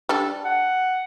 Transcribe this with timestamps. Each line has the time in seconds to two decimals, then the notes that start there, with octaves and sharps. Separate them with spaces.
0.09 G3 D4 A4
0.45 F#5